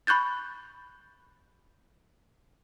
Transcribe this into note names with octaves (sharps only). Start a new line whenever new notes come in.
B5 C#6 F#6 G6 A6